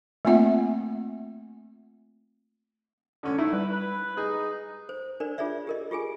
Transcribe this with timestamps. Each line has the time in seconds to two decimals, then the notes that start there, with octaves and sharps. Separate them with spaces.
0.25 A3 A#3 C4 F4 E5 F#5
3.23 D3 C#4
3.38 A3 D#4 E4
3.53 G3 B4
3.72 B4
4.17 D#4 G#4
4.89 C5
5.20 D4 A#4 C5 D5
5.38 F4 G#4 C#5 D5 E5
5.67 G4 A#4 D#5
5.91 F4 G4 G#4 G#5